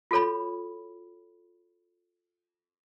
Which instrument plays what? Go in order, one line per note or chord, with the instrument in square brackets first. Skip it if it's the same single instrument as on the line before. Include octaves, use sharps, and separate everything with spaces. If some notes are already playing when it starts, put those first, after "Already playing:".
[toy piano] F4 F#4 A4 C#5 B5